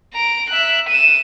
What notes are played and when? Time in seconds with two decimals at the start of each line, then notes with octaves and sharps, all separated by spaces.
0.14 A#5 D7
0.49 E5 F#6
0.88 D#7 E7